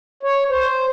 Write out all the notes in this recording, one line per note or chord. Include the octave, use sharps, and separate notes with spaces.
C#5
C5